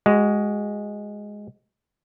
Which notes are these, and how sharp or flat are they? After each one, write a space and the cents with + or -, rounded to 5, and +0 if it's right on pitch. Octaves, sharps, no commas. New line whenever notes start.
G#3 +0 F#4 +25